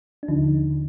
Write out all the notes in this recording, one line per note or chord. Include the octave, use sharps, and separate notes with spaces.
D4
D#2 D3 F3 D#4